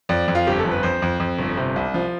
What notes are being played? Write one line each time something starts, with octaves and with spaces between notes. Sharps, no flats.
F2 D5
F2
F4
G1 G4
A4
F2
B4
F2 C5
F2
F2
G1
C3
C2
F3